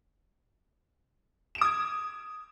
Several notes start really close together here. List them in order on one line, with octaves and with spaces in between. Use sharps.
E7 D7 D#6 G#6